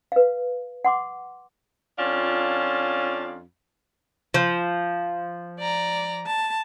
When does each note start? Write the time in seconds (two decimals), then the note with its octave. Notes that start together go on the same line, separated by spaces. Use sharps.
0.12 B4 F5
0.85 F#5 C6 D6
1.99 F2 C#4 D4 F4 F5
4.34 F3
5.59 D5 A#5
6.26 A5